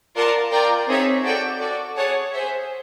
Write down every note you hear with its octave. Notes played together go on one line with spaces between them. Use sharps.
F4 A#4 D5 F#5 A5
F4 A#4 D5 G5
C4 D#4 G#4 C#5 E5
F#4 A4 D5 G5
F#4 A4 D5
G#4 C#5 F#5 A5
G#4 C5 E5